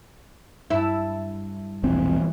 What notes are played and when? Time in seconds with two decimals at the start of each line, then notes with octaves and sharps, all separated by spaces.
0.70 G2 E4 A5
1.83 E1 A#1 E3 C4